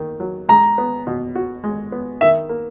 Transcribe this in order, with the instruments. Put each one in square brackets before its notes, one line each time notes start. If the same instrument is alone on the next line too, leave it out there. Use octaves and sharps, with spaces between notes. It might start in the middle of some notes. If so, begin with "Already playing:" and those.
Already playing: [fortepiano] D#2 D#3
F#3
[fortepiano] G#3 [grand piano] A#5
[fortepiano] B3
B2
F#4
G#3
B3
[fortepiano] D#3 [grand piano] E5
[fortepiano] A#3